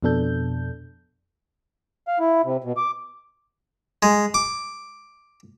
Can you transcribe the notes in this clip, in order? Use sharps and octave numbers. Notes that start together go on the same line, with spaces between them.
F2 B2 D4 A4 G6
F5
E4
C3
B2
D6
G#3
D6